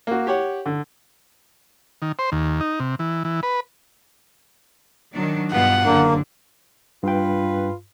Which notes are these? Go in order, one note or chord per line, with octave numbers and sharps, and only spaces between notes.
A#3 F#4
G4 C#5 F#5
D3
D#3
C5
D#2
D#4
C3
E3
E3
B4
D#3 F#3 D4
G2 B2 B3 F4 F#5
F#1 D3 A#3 D4
G2 F4 B4 G5